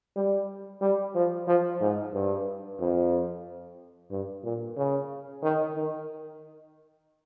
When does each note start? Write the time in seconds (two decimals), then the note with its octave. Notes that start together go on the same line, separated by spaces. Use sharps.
0.16 G3
0.81 G3
1.15 F3
1.47 F3
1.81 G#2
2.13 G2
2.80 F2
4.11 G2
4.44 A#2
4.77 C#3
5.43 D#3
5.76 D#3